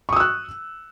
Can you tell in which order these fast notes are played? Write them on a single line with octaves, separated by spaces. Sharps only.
C#6 D#6 E6 F#6